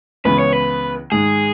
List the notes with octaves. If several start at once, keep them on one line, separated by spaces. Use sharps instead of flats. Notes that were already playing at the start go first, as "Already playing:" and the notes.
C#2 C#3 E3 G#3 B3 B4
C#5
B4
G#2 D#3 G#3 G#4